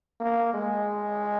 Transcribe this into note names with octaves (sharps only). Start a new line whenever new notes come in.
A#3
G#3